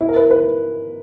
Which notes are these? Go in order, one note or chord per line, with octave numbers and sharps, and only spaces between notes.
E4
A#4
B4
B4